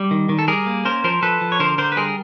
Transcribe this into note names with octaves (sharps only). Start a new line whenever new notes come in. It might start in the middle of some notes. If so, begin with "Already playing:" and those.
Already playing: G3
D#3
D#3
A4
G3 G#4 A#4
A#3
C#4 A#4 C5
F3 A#4 C5
F3 A4 B4
F3
C#5
D3 A#4 C5
D3 A#4 C5
B4
G3 G#4 A#4